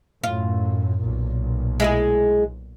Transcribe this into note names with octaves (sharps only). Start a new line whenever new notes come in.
F#2 A2 F4
B1 A#2
G#3 E4 G#4